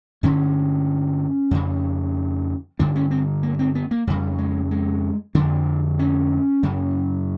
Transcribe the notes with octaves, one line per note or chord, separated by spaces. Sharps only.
G2 D3 C#4
F2 C#3
G2 D3 D4
C#4
C4
A#3
C4
B3
A#3
F2 C#3 G3
G#3
G#3
F2 D3 D4
C#4
F#2 C#3